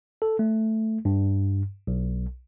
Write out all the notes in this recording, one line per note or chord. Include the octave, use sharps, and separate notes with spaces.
A4
A3
G2
B1